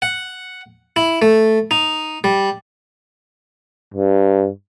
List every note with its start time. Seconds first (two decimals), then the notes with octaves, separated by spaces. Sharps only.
0.02 F#5
0.96 E4
1.22 A3
1.71 D#4
2.24 G3
3.94 G2